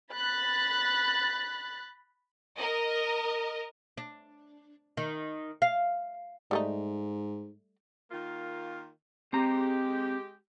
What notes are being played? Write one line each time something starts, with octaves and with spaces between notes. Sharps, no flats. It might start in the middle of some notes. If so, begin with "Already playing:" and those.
B5 F#6 A6
A#4 D#5
D4
D#3
F5
G#2 G3 A3 D#4
D#3 A#3 F4
G#3 C4 G4 A#5